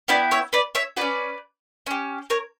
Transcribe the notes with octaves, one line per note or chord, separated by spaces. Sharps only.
B3 E4 G4 D5 F#5
C#5 E5
B4 D5
C#5 E5
C#4 F#4 B4 D5
C#4 G4
A#4 C#5